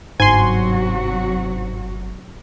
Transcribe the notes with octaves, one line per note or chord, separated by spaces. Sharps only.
G1 G#2 C3 F#3 F#4 G#5 C6